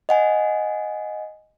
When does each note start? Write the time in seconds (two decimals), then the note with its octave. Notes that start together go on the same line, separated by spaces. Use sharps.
0.09 D#5 F#5 G#5